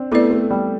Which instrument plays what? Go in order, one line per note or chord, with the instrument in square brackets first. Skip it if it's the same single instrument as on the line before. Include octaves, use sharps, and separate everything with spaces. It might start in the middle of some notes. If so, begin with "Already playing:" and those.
Already playing: [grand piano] C4 D4
[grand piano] A3 [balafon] B3 E4 B4 D5
[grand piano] A3
G3